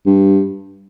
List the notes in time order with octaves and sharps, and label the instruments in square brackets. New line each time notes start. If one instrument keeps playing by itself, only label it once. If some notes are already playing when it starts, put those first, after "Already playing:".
[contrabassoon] G2